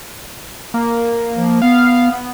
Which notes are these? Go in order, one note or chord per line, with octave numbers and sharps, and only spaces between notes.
A#3
F3
B3 F5
B3